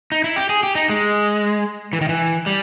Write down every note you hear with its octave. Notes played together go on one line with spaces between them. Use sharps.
D#4
E4
G4
G#4
G4
D#4
G#3
E3
D#3
E3
G3